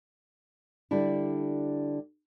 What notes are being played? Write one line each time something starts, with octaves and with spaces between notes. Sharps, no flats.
D3 G3 D4 E4